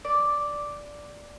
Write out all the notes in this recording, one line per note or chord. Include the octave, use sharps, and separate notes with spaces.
D5